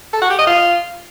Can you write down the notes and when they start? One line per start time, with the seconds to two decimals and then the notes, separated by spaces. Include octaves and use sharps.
0.13 A4
0.22 F#4
0.30 G4
0.38 D#5
0.47 F4